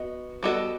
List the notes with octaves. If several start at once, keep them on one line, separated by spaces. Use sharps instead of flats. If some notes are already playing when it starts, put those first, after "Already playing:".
Already playing: B3 F#4 D#5
G3 B3 F#4 A4 D#5